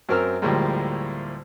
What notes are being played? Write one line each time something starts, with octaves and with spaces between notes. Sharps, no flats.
F#2 C4 A#4 E6 F6
D2 A2 F3 G3 G#3 A#3